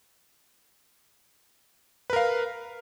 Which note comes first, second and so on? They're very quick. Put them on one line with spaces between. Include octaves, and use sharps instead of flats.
B4 A#4 F5